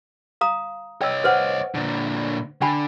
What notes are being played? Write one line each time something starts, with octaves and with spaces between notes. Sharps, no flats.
F5 A#5 D#6
C#5 D#5 G5 E6
B4 C5 F#5
A#2 D3
D3 G5 G#5 B5